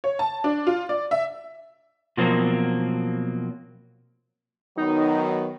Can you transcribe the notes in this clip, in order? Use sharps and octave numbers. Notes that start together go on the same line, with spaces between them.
C#5
A5
D4
F4
D5
E5
B2 F3 F#3 A#3 C4
D#3 F#3 B3 D#4